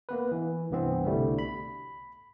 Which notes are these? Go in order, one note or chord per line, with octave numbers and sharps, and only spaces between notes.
A#3 B3 B4
E3
C2 G2 E3 B3 C4
C2 B2 D3 G3 A3
B5